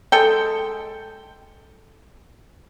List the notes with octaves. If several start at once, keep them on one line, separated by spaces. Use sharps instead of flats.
G#3 A4 G5